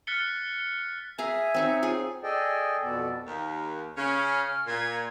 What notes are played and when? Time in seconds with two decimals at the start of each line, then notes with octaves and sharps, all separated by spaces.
0.07 F6 F#6 A6 B6 C#7 G7
1.18 G#4 E5 F5 G#5 A#5
1.54 C4 D#4 C#5
1.83 F4 G#4
2.23 G#4 A4 D5 D#5 G5 G#5
2.82 F2 B2 B3 A4 D5
3.26 D#2
3.97 C#3 C#4 F6
4.66 A#2 G#6